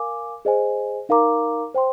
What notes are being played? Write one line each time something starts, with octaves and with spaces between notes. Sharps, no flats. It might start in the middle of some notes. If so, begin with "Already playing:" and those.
Already playing: A#4 F5 G#5 D6
G#4 C5 D#5 G#5
D#4 A#4 F5 A#5 D6
C5 G5 C6